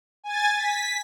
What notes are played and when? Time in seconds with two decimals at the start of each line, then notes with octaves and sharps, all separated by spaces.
0.24 G#5 A6
0.57 B6